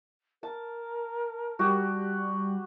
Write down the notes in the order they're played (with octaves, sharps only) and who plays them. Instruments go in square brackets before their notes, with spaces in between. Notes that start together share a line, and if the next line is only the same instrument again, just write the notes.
[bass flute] A#4 [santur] A5
[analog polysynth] G3 [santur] F#4 G4